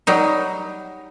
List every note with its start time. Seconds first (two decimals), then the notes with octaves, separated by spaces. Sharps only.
0.07 F#3 G3 D#4